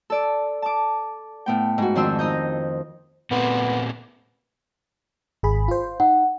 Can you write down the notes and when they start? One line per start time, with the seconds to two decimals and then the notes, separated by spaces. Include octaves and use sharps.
0.10 A4 D5
0.62 A5 D6
1.46 A2 B3 G5
1.78 G#2 F#4
1.95 F2 D#3 C4 D4 C5 E6
2.19 D#4 D#5 G6
3.31 A#2 A3 B3 C4
5.43 G#1 G#4 B5
5.68 F4 C5
6.00 D#4 F#5